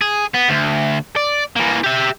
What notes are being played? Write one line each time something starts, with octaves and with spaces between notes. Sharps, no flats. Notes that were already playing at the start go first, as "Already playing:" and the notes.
G#4
B3
D2
D5
E3 A#3
G4 E5